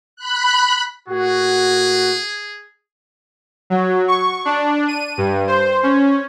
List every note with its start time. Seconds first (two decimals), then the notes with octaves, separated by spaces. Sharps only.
0.16 B5 F#6
1.08 A2 A#3 F#4 G#4
3.70 F#3
4.08 C#6
4.45 D4
4.88 D#7
5.18 G2
5.47 C5
5.83 C#4